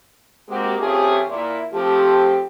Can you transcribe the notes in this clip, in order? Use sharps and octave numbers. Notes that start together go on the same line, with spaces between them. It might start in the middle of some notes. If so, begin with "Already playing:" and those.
G#3 A#3 C4 F#4 G4
F2 F3 A3 C#4 G4 G#4
A#2 E4
F3 A3 C4 G4